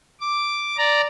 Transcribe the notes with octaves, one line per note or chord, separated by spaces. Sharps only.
D6
D5 A#5